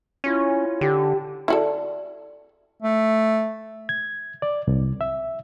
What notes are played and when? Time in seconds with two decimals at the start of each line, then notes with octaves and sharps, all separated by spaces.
0.24 C#4 E4 F4 C#5
0.81 D3 G4
1.48 E4 F#4 A4 D5
2.82 A3
3.89 G#6
4.42 D5
4.67 C2
5.01 E5